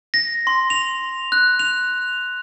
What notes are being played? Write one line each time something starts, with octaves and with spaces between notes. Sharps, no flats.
A#6
C6
F7
F#6
F7